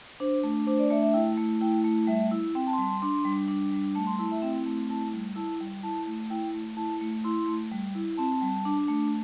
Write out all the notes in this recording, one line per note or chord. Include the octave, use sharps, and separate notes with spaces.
D4 C5
A3
D4 C5
D5
A3 E5
E5
E4 G5
A3
E4 G5
A3
G3 E5
E4
C4 G5
A5
C6
G3 A5
C6
D4 C6
G3
D4
G3
A3 A5
C6
E4 A5
E5
C4 G5
A3
E4 A5
G3
E4 A5
G3
E4 A5
A3
E4 G5
A3
E4 A5
A3
E4 C6
A3
G3
E4
C4 A5
G3
D4
A3